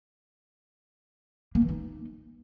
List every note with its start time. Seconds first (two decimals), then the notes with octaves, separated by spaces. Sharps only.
1.55 A#3
1.62 E3
1.69 D#4